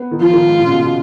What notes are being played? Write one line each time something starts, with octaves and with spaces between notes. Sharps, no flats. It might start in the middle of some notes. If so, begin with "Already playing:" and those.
Already playing: B3
D#3
F3 F4
D#3
G#2
A#2
C#3
B2
B2